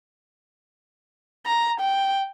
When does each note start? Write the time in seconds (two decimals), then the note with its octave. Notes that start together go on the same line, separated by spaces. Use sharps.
1.46 A#5
1.80 G5